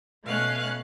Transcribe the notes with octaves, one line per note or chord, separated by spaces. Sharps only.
B2 A3 C#4 F5 F#6